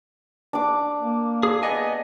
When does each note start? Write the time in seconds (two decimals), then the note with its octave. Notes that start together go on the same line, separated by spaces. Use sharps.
0.53 D4 D6
1.00 A#3
1.43 G#4
1.63 B3 D#5 G#5